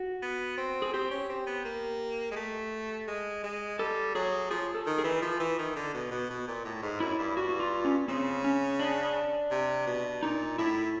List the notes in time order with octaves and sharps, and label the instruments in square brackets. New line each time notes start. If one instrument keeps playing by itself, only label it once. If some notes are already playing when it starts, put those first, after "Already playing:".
Already playing: [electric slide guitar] F#4
[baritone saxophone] B3
C4
[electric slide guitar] G#4
[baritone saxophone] C4 [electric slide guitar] G4
[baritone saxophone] C#4
C4
B3
A#3
G#3
A3
G#3
G#3
[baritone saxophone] G3 [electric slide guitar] A4
[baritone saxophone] F#3 [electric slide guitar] G#4
[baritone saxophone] F3 [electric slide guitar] G#4
[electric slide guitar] A4
[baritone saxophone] D#3
[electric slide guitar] G#4
[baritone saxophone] E3
F3
E3
D#3
D3
B2
B2
B2
A#2
A2
G#2
[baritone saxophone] F#2 [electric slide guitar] E4
[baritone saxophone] G2
[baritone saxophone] G2 [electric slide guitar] F#4
[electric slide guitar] F#4
F4
C#4
[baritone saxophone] C#3 [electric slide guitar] C4
[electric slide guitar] C#4
D4
[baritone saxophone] C3
B2
[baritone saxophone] A#2 [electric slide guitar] D#4
[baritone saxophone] A2 [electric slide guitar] E4